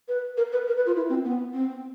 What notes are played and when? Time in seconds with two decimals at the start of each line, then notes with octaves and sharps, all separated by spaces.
0.08 B4
0.37 A#4
0.52 B4
0.67 A#4
0.77 B4
0.87 F4
0.96 E4
1.09 C4
1.25 B3
1.53 C4